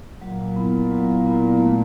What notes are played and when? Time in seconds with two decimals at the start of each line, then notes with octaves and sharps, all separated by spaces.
0.21 A#2 F#3
0.56 B3 E4
0.91 F#3
1.26 B3 E4
1.61 A3